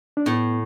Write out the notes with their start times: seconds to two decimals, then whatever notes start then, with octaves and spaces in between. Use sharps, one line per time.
0.17 D4
0.26 A2 B3